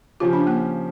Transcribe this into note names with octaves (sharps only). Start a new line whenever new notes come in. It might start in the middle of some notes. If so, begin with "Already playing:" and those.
C#3 F3 C#4 F4 G4
D4
A#3